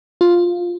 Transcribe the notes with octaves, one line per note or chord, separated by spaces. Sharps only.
F4